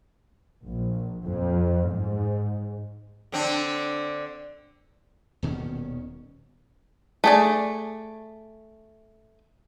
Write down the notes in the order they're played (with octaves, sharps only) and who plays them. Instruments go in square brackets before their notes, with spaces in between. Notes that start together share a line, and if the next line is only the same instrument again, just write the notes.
[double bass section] A#1
F2
G#2
[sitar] D3 C4 D4
[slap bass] D#1 B2 D#3 C#4
[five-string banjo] A3 G#4 D5